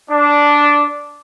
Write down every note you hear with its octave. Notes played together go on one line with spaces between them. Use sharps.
D4